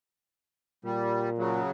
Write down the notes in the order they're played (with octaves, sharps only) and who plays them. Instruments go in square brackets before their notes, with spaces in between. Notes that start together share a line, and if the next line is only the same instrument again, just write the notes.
[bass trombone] A#2 [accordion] G3
[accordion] C#3 F#3